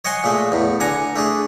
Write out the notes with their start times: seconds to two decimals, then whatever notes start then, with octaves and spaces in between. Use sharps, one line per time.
0.05 C#5 D#5 F#5 G#5 C6
0.24 A#2 G#3 A3
0.52 E2 A2
0.80 D3 F#5 G#5 A#5
1.16 A3 D4 G#4